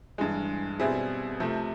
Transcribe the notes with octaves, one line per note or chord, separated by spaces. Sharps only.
G2 E3 G#3
B2 G3 C4 E4 G#4
C3 F3 A3